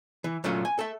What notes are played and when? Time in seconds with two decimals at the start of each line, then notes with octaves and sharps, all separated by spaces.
0.24 E3
0.44 A#2 F#3 A3 C#4 F4
0.65 G#5
0.79 A4 E5